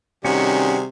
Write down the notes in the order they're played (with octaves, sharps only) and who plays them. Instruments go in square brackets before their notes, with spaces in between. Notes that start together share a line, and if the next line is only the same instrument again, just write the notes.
[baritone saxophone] C3 [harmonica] D#3 F#4 G#4 [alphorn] G3 [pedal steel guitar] C#4